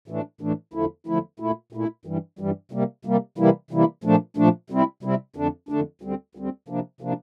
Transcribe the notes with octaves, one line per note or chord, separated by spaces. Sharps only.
A2 E3 A3 D4
A2 E3 A3 D4
E2 D3 F3 A3 E4
E2 D3 F3 A3 E4
A#2 A3 E4
A#2 A3 E4
G2 E3 G3
G2 E3 G3
C3 G3 A#3
C3 G3 A#3
C3 E3 G3 A#3 E4
C3 E3 G3 A#3 E4
A#2 F3 A3 D4
A#2 F3 A3 D4
C3 G3 C4 E4
C3 G3 C4 E4
F2 D3 A3 D4
F2 D3 A3 D4
D2 D3 G3 C4
D2 D3 G3 C4
C3 F3 A#3 D4
C3 F3 A#3 D4